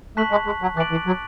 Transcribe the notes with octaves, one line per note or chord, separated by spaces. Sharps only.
A3 A5 C#6 F#6 B6 F#7
G#3
G#3
F#3
E3 D6 F#6 A6 D7 F#7
E3
F#3